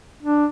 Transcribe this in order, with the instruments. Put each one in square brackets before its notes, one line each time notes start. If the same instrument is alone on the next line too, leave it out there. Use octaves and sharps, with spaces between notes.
[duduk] D4